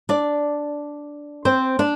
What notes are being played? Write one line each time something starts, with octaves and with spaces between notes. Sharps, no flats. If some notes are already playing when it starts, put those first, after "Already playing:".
D4 D5
C4 C5
D4 D5